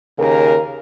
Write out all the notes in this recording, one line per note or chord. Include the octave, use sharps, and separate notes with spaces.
D#2 C#3 A#4